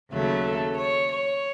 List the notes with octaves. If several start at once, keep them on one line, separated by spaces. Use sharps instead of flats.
D#2 C#3 F#3 A3
A4
C#5
C#5